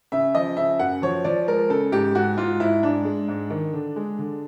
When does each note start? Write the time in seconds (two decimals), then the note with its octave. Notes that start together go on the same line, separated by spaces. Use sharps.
0.12 C#3 E5
0.35 F3 D#5
0.57 C#3 E5
0.79 F#2 F#5
1.02 F3 C#5
1.24 F3 D5
1.48 G#3 A#4
1.70 C#3 A4
1.92 G#2 G4
2.15 G#2 F#4
2.37 G#2 F4
2.60 G#2 E4
2.83 G#2 D4
3.05 G#3
3.28 G#2
3.50 D#3
3.73 D3
3.96 G#3
4.19 D3